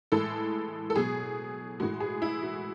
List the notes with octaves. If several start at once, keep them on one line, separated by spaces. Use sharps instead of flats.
A2 E3 G#3 A4
A4
B2 F#3 G#4
A2 E3 G#3 F#4
G#4
E4
F#4